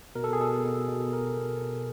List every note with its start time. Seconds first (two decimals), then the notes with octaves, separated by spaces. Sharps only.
0.15 B2 A#4
0.24 A4
0.33 G#4
0.40 B2 A4
0.65 B2
0.89 B2
1.13 B2 A#4
1.37 B2
1.62 B2